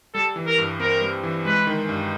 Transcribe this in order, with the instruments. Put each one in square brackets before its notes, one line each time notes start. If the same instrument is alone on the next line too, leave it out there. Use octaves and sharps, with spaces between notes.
[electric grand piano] G3 [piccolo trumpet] A4
[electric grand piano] E3
[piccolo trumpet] A#4
[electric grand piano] G2
[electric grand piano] C4 [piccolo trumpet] A#4
[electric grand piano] G3
E3
[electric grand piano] G#3 [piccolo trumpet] B4
[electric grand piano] D#3
G2